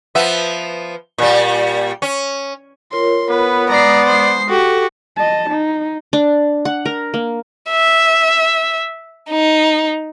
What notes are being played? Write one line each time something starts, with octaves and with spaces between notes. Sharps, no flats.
F3 B3 E5
A#2 G3
C#4
F4 A#4 C#5 C6
B3 B4
G#3 D5 A#5 D#6 C7
C5 C7
F#4 G4 A4
D#5 A5
D#4
D4
F#5
A#4
A#3
E5
D#4